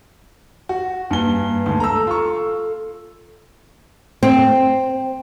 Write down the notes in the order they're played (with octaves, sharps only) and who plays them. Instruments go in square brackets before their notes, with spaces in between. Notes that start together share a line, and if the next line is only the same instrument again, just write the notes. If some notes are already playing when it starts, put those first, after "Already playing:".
[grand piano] F#4
[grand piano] G2 G#5 G7 [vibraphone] A#3 B4
[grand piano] D2 G#2 [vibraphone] A5
[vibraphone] A4 [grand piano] A#5 E6
[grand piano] F4 C#6
[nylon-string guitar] C4